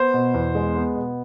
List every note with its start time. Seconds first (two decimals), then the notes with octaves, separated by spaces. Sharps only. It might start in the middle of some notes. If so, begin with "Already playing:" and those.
Already playing: B3 C5
0.14 B2
0.34 E2
0.55 G#3
0.76 B3
0.96 B2